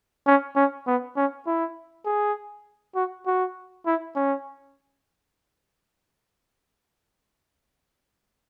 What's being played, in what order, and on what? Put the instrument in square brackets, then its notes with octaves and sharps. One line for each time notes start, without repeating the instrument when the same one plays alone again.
[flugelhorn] C#4
C#4
B3
C#4
E4
G#4
F#4
F#4
E4
C#4